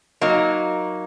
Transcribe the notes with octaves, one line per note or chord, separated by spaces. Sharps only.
F#3 A#3 D#4